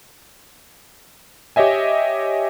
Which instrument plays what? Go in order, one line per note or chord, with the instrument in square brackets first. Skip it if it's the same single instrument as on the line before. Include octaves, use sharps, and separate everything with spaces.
[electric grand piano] G4 C#5 D#5 E5 G#5